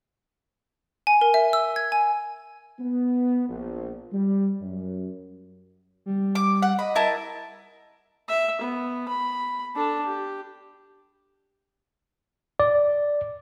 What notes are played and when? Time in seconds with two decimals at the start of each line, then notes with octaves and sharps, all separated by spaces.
1.07 G#5
1.21 A#4
1.34 E5
1.53 E6
1.76 G#6
1.92 G#5
2.79 B3
3.48 A#1
4.13 G3
4.60 F#2
6.06 G3
6.35 D6
6.62 F#5
6.79 D#5 B5
6.96 E4 A#4 A5
8.29 E5
8.61 B3
9.08 B5
9.75 D4 A4
10.06 G4
12.60 D5